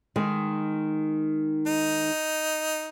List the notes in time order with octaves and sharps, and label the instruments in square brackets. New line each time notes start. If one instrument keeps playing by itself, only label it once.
[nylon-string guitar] D#3 G#3
[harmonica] D#4